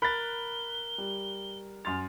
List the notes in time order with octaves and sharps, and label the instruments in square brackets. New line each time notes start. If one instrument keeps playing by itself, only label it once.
[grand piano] A#4 A6 [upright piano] B5 F#6 B6 [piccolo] G7
[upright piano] G3
[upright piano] F#2 C6 A6 [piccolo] F7